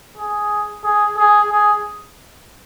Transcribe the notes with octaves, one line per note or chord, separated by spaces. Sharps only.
G#4
G#4
G#4
G#4